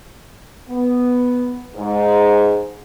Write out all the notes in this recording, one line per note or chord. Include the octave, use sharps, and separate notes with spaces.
B3
G#2